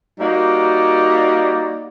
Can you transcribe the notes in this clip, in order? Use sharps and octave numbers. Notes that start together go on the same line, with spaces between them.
G3 A#3 D#4 F#4 D5